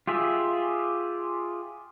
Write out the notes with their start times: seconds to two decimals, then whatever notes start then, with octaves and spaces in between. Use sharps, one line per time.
0.07 F4 G4 G#4 E5